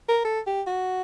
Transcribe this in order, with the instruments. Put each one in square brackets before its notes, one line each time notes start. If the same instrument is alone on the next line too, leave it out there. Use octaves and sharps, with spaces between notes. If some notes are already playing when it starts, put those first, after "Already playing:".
[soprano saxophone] A#4
A4
G4
F#4